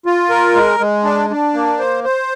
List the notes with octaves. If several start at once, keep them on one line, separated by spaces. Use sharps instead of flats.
F4
A#4
G#3
G#3
D4
D4
A#3
C5
C5